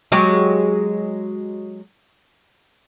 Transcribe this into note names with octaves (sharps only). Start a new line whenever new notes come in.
F#3 G#3 G4